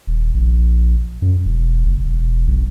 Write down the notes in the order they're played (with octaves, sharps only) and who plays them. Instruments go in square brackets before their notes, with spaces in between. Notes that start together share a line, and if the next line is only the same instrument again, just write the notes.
[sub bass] D#1
A#1
F#2
E1
F#1
E1
B1